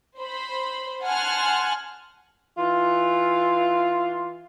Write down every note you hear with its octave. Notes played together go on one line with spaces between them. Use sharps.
C5 B5
F#5 G#5 A5 C6 F6 F#6
E3 F4